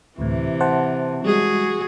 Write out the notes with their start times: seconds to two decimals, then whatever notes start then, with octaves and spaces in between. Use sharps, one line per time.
0.18 D2 A2 C3 E3
0.61 C5 F#5 A5
1.24 G3 G#3 F#4 G#4